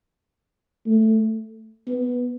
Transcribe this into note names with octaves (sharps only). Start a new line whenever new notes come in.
A3
B3